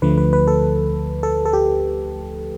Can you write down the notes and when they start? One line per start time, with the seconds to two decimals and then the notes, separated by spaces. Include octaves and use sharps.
0.02 D2 D3 F3 A3 B4
0.18 B4
0.33 B4
0.47 A4
1.23 A4
1.46 A4
1.53 G4